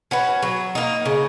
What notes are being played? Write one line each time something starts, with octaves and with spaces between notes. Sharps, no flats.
C#4 F#4 B4
F#3
A#3 D#4
C#3